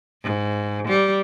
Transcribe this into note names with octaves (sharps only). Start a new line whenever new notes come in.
G#2
G3